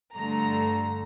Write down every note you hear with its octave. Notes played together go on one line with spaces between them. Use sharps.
G2 D3 A3 A#5